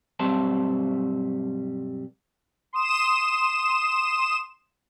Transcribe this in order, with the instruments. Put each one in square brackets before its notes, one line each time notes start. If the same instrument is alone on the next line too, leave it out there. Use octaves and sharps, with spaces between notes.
[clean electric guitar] B1 G2 G3 C4 C5 A5
[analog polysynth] C6 D#6 E7